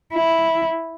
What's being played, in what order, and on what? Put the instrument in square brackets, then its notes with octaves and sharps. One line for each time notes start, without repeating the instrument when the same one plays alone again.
[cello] E4